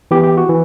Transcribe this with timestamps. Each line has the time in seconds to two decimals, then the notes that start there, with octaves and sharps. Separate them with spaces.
0.11 E3 B3 G4
0.23 G4
0.37 F#4
0.49 E3